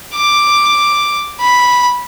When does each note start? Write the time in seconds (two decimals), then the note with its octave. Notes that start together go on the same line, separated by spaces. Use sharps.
0.15 D6
1.40 B5